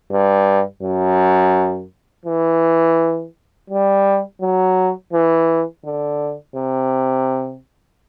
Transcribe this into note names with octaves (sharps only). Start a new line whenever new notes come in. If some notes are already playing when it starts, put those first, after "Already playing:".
G2
F#2
E3
G3
F#3
E3
D3
C3